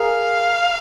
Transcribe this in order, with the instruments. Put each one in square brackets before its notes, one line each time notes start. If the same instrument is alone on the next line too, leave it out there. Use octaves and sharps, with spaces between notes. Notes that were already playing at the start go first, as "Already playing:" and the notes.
Already playing: [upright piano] G#4 A#4 [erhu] F5